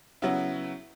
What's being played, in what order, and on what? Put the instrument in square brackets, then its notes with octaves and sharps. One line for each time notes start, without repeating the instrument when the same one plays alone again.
[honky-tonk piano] C#3 F#3 B3 E4